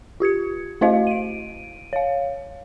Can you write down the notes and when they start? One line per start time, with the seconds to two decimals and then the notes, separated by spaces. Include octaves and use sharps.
0.20 F4 G4 G#6 C#7
0.81 A3 E4 F#4 C5 D#5 F5
1.07 D7 D#7
1.93 C#5 F5